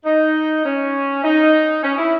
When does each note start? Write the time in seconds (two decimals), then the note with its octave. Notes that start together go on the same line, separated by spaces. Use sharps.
0.05 D#4
0.65 C#4
1.24 D#4
1.83 C#4
1.98 E4